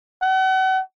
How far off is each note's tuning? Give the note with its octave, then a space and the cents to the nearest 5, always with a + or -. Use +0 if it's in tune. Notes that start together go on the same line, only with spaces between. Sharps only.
F#5 +40